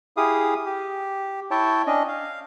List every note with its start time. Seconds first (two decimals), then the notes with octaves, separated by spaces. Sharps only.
0.17 E4 G4 G#4 F5 D#6
0.66 G4
1.51 E4 C#5 E5 G5 A5
1.87 C#4 D4 D#5
2.08 F5